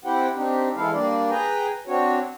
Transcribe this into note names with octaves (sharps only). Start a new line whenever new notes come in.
C4 E4 G4 C5 F#5 G5
C4 D4 D#4 G4
E3 G#3 E4 A4 F5
G3 A#3 D4 D5
G#4 B4 G5 G#5 A#5
C4 D4 F#4 C#5